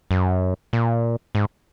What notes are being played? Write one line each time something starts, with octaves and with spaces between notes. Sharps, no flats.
F#2
A#2
G#2